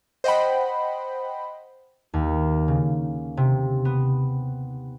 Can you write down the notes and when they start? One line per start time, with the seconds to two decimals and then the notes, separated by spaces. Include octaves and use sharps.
0.24 C5 D#5 F#5 G5 B5
2.14 D#2
2.68 C#3
3.37 C3
3.85 B3